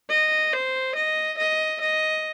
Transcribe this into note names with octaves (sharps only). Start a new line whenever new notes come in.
D#5
C5
D#5
D#5
D#5